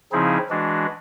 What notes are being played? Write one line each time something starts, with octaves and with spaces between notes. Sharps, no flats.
C#3 F3 C4 D#4 E4 G#4
E3 G#3 D4 F#4